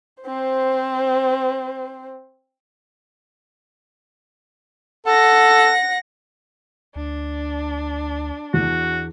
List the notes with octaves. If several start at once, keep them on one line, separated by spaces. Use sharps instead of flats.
C4 C5
A4 F#5 A#6
D2 D4
E2 F#4